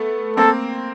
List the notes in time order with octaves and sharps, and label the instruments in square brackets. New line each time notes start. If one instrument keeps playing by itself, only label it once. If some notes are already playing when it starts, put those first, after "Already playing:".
Already playing: [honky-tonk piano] A3 B3
[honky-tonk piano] A#3 C4 [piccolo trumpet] A4